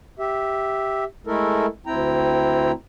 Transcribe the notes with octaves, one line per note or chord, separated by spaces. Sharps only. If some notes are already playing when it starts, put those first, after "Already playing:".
G4 E5
G#3 A3 E4 A4 A#4
D2 C4 E4 G5 A#5